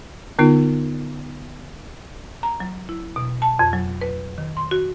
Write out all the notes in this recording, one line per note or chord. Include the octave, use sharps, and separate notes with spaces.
D3 B3 D#4 F4
A#5
F#3
E4
B2
A5
F2
F#3
B4
D#3
C6
F#4